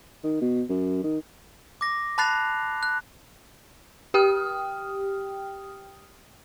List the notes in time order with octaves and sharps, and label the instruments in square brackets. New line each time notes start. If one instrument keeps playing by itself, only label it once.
[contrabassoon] D#3
B2
F#2
D#3
[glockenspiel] D6 A#6
A5 B5 F#6 A6 C7 F7
F#6
[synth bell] G4 G5 D#6 F6